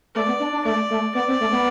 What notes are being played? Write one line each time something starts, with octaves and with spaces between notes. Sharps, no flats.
A3 D5
B3
D4
D4
A3 D5
A3
B3 D5
C4
A3
B3